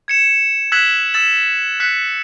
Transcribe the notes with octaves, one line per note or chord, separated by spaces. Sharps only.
G#6 C#7 E7
E6 F#6 G#6 B6 E7 F#7
E6 A6 E7 F#7
F#6 B6 C#7